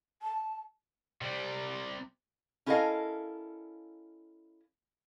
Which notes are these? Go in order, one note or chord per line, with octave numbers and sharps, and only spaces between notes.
A5
C3 G3
C#4 E4 A4 A#4 D#5 F5